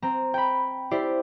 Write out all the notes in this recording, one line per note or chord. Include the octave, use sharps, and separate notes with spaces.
C4 A#5
G5 B5
E4 G4 C5 D5